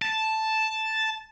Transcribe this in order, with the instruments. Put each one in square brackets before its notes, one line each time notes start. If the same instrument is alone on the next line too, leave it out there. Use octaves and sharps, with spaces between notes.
[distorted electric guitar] A5